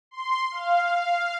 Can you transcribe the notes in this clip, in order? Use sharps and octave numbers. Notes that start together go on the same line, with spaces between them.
C6
F5